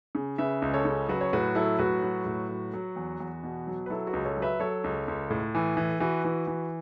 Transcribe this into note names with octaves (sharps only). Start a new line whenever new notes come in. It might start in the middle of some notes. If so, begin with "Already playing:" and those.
C#3
C#3 B4 E5
C#2
A4 C#5
C#3
F#3 F#4 B4
C#5
A2 F#4 B4
F#3 E4 A4
A2 F#4 B4
F#3
A2
F#3
F#3
E2
E2
B2
F#3
B4
F#3 E4 A4
F#4 B4
C#2
A4 C#5
F#3
B4 E5
F#3 A4 C#5
C#2
C#2
A2
E3
E3
E3 F#4 B4
E3
E3